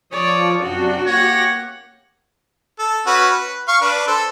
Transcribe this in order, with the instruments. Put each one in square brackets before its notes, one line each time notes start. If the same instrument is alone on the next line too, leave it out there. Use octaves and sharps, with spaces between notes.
[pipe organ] F3 [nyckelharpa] C#5 D#6 [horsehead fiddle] D5
[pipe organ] F#2 C3 D4 [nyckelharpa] C#4 G5 [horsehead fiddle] F#4
[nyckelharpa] A#3 F#5 [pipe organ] G4 A#6 [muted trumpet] C#5
[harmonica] A4
C#4 F#4 B4
B4
F5 C#6
D4 B4
A4 C5